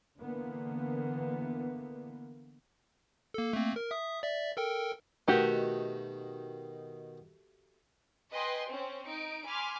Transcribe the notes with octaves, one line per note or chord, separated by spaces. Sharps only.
D3 E3 A#3 B3
A#3 A4
A3 A#3 C4
A#4
E5 D#6
D5 E5
A4 A#4 G5
B2 D#3 A3 D#4 F#4 G4
B4 D#5 G5 G#5 C6
C4 C#4
D#4 D7
G#5 B5 C6 D6 F6